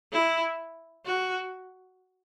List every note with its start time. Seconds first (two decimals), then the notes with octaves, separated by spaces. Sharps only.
0.12 E4
1.05 F#4